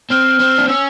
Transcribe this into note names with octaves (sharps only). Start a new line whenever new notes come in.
C4 F6
C4
D4
C#4 E6